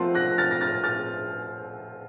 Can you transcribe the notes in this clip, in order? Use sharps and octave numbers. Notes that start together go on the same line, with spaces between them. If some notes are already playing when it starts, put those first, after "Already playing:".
Already playing: F3 A3 C4 F4 A#4 F#5 A5 C6
F#6 A#6
F6 A6
A#6
F6 A6
F6 A6